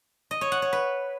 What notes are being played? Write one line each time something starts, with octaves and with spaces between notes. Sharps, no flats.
D#5
C#5
F#5
C#5
B4